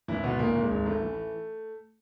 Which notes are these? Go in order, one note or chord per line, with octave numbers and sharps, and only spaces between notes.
G#1 E3 E4
G#1 B2 B3
G#1 A#2 A#3
G#1
G#3
G#1
A1 A3
E3